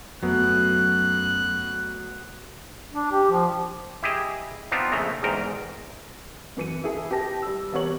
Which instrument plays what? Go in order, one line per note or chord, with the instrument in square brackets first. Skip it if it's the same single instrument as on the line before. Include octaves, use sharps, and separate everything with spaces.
[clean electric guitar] F#2 [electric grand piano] F#3 A3 B3 [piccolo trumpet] F#6
[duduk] D4
G4
F3
[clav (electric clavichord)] E4 G4 G#4 D#5
B3 C4 D4 D#4 F4
A#1 C#3 A3 A#5
E2 G#2 A#4 G5 A#5
[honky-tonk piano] F#2 E3 C#7 D#7
E4 G#4 A4 E5
G4 B4 A5 A#6
G3 E6
E3 G3 B3 A#4 C#5 F#7